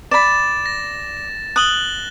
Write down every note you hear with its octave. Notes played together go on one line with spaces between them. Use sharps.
D5 B5 A6 E7
A#6
D#6 F#6 F#7 G7